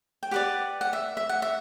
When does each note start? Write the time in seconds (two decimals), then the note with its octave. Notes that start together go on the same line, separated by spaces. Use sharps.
0.23 G5
0.31 G4 B4 D5 F#5
0.81 F#5
0.93 E5
1.17 E5
1.29 F#5
1.42 E5